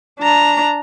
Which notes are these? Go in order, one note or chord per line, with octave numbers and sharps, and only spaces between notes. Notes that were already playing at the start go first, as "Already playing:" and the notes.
D4 A#5